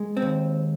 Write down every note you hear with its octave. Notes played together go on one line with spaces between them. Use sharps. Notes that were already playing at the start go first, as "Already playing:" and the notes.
Already playing: G#3
C4
D#2